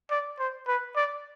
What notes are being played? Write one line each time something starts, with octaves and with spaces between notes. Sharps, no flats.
D5
C5
B4
D5